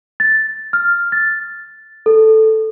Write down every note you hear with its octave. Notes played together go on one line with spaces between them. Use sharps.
A6
F6
A6
A4